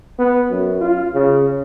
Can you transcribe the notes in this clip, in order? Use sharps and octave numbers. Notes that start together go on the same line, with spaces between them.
B3
F#2
F4
C#3